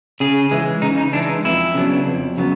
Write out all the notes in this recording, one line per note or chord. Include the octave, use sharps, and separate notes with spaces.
C#3 G#4
E3 G#3
C#3 D#4
D#4
E3 G#3 D4
D#4
F2 E4
C#3 F#3 B3 D4
F2
C#3 F#3 B3